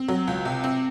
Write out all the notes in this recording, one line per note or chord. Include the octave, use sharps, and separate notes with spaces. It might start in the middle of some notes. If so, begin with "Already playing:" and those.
Already playing: C4
F#3
C#2
C3
C4